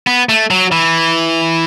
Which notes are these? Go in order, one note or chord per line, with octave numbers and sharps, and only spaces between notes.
B3
A3
F#3
E3